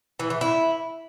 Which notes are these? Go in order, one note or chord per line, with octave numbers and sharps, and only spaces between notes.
E3
E3
E4